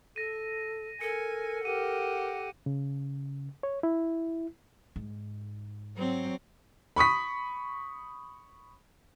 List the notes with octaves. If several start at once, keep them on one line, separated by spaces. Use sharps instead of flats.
A4 A#6 D#7
A4 A#4 G#5 C#7
G4 A#4 F#5 D#7
C#3
C#5
E4
G#2
F#3 C4
B5 C#6 D#6 B6